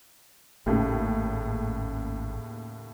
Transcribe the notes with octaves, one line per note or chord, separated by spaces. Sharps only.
G#1 D#2 A2 C#3